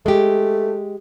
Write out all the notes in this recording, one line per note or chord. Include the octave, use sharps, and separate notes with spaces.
G#3 A3 G4